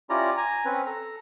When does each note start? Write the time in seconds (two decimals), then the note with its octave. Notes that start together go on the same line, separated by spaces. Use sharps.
0.10 C#4 E4 F4 G4 D5 A#5
0.37 G#5 A#5
0.65 C4 C#4 B4
0.86 A4 A#5